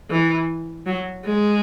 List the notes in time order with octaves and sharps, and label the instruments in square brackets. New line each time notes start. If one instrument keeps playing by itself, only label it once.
[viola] E3
F#3
G#3